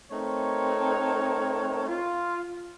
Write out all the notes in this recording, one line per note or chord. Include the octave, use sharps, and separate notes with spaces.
A3 C4 D#4 A#4 C#5
F4